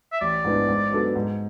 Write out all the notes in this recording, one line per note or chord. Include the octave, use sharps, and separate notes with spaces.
E5
A1 D5
G#2 E3 B3 D4
G#2
F#3 B3 D4 A4
G#2